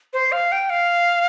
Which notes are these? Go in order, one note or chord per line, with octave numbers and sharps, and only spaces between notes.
C5
F5
G5
F5